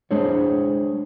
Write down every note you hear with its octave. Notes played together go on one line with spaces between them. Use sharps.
G#3 D4 G#4 C5 C#5